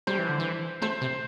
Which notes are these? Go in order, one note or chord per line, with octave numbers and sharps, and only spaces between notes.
G3 C5
E3
D3
E3
A3 C5
C3